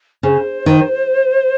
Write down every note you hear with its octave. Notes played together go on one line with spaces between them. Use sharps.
C#3 C5
D#3